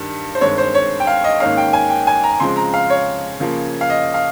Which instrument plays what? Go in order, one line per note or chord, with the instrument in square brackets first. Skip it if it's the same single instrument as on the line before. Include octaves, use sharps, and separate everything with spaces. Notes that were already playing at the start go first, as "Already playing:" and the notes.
Already playing: [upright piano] G2 D#3 G3
C5
G2 D#3 G#3 C4 C#5
C5
C#5
G5
F5
D#5
G#2 D#3 A#3 C#4 F5
G5
G#5
G5
G#5
A#5
C#3 F3 G#3 C4 C6
A#5
F5
C#5
C#3 F3 A#3
F5
D#5
F5